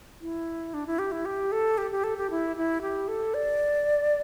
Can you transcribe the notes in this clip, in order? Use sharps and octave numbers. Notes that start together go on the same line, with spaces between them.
E4
D4
E4
G4
E4
G4
A4
G4
G4
A4
G4
E4
E4
G4
A4
D5